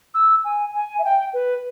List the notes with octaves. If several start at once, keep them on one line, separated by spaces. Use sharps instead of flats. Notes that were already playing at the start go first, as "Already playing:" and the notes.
E6
G#5
G#5
E5
G5
B4